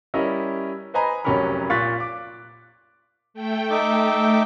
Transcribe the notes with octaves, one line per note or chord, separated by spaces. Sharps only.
G3 C#4 E4 A#4 D#5
B4 C5 D#5 G#5 A#5 B5
F1 F#3 C#4 G4 A#4 B5
A#2 F4 C#6 F#6 A6 B6
D6
A3 G5
D#4 E5 D6